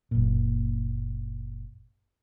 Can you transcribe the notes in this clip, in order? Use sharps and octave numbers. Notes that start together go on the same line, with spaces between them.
F#1 A#2